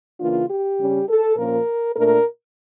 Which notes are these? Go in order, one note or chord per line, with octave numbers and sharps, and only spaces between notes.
C#3 E3 A#3 D4 F4
G4
C#3 G3 C#4
A4
A#2 F3 A#3 C#4 A#4
A#2 A3 D4 A#4